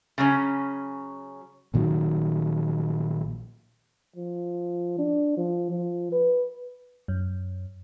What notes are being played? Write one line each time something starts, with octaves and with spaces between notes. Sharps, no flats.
C#3 F#3 C#4
A#1 A#2 D#3 F#3
F3
D4
F3
F3
B4
F#2